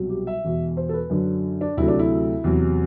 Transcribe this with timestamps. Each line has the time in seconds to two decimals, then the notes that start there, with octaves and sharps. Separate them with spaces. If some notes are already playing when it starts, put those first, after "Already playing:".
Already playing: C2 B2 F#3
0.09 G4
0.27 E5
0.44 E1 E2 B2
0.77 C5
0.89 A4
0.94 B4
1.10 F#2 D3 F#3
1.61 D4
1.77 D2 C3 F#3 A3 E4
1.88 D4
1.99 E4
2.44 E2 C3 F#3